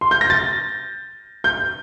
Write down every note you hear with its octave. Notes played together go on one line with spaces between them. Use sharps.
C6
G6
A#6
A6
G6